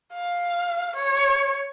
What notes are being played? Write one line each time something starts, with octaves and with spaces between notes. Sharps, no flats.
F5
C#5